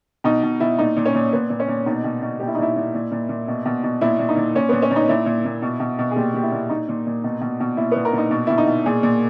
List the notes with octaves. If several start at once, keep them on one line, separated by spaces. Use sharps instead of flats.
B2 D#4
B2
B2 E4
A#2 D#4
A#2
C#4
A#2
A#2 B3
A#2
C#4
A#2
B2 D#4
B2
B2
A#2 G4
E4
D#4
A#2 E4
A#2
A#2
A#2
A#2
B2
B2
B2
A#2 E4
A#2
D#4
A#2
A#2 C#4
A#2 B3
C#4
A#2
D#4
A#2 E4
A#2
A#2
B2
B2
B2
G#4
A#2 G4
A#2 G4
E4
A#2
A#2 D#4
A#2
A#2
B2
B2
B2
A#2 E4
A#2 B3
A#4
A#2 D#4
B2
B2 E4
D#4
B2
A#2 G#4
A#2